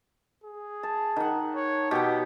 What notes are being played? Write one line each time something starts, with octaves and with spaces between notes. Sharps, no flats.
G#4
A5
D#3 F#5
C#5
B2 G4 F#5 G5